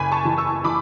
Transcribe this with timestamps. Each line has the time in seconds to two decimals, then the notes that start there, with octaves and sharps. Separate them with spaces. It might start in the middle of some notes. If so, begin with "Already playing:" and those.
Already playing: F#1 G#5 B5
0.12 A5 C#6
0.25 E3
0.38 C#6 E6
0.64 E3 B5 D6